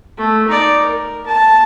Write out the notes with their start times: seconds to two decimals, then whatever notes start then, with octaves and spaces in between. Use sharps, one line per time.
0.17 A3
0.48 D#4 D5
0.81 A#4
1.26 A5